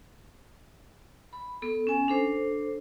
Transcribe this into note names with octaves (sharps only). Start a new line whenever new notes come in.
B5
B3 A4
C#4 G#5
D4 A4 C5